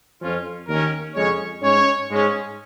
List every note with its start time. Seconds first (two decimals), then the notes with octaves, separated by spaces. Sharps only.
0.21 F2 F3 C#4 F4
0.68 D#2 D#3 C#4 A#4
1.15 F2 C#3 G#3 C#4 C#5
1.62 G#2 G#3 C#4 C#5
2.10 G#2 G#3 C#4